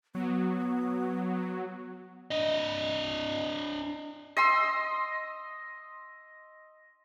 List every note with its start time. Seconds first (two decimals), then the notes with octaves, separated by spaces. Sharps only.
0.15 F#3 B3
2.31 D4 D#5
4.37 D#5 C6 E6